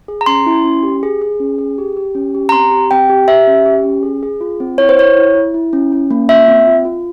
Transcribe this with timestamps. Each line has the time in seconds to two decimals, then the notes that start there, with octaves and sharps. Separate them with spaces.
0.08 G#4
0.21 A#5
0.26 C#4 C6
0.46 E4
0.64 C#4
0.83 G4
1.03 G#4
1.21 G#4
1.40 C#4
1.59 G#4
1.78 G4
1.97 G4
2.15 C#4
2.34 G4
2.49 A#5
2.52 C4 C6
2.71 G4
2.91 C4 G5
3.09 G4
3.28 G4 E5
3.47 C#4
3.66 G4
3.84 C#4
4.03 G#4
4.23 G#4
4.41 F4
4.60 C4
4.78 E4 C#5
4.89 C5
4.98 E4 C#5
5.16 E4
5.35 E4
5.54 E4
5.73 C#4
5.92 C#4
6.11 A#3
6.29 F4 E5
6.48 C4
6.67 F4
6.85 F4